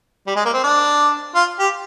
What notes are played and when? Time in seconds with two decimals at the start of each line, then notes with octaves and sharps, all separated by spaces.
0.27 G3
0.36 G#3
0.45 A#3
0.53 C4
0.63 D4
1.35 F4
1.60 G4